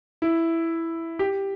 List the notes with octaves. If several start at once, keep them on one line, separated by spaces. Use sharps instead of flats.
E4
G4